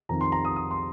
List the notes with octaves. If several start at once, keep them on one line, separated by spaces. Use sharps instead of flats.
F2 D#3 A#5
C6
A#5
D#6
D#6
C6